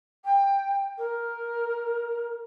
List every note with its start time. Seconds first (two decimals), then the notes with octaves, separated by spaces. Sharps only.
0.25 G5
0.98 A#4